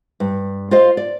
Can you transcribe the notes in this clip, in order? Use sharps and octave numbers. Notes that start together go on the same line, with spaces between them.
G2
F4 C5 D#5 F5
D5